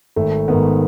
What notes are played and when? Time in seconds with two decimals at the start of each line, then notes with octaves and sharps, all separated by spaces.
0.16 G#1 A3
0.48 G#2 D#3 B3